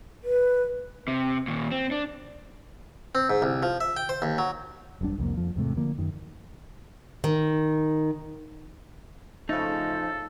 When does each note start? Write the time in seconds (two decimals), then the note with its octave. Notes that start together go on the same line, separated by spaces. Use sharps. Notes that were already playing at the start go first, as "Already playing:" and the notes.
0.24 B4
1.08 C3
1.47 D#2 A#2
1.71 C4
1.91 D4
3.15 C4
3.30 G#2
3.42 C2
3.63 F3
3.81 E5
3.97 G5
4.09 C5
4.22 D#2
4.38 F#3
5.01 E1 B1 G2 D4
5.18 C2 F2 A#3
5.37 F2 F3
5.56 E2 G#2 C3 A3
5.77 D3 F3 A#3
5.98 F#2 D#3
7.24 D#3
9.49 C#3 F3 A3 D#4 A4